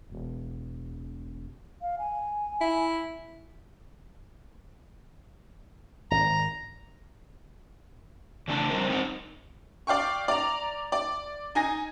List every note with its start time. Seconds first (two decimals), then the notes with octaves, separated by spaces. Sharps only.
0.10 E1
1.81 F5
1.98 G#5
2.61 E4
6.11 G#1 A#5
8.48 C#3 E3 A3 D4 D5 A5
8.70 F3 G3 C4 F#4 A#4 C5
8.89 G#3 C4 D#4 C5 F#5
9.87 D5 F5 G5 C#6
10.28 D5 A#5
10.92 D5
11.55 D#4 G#5 A#6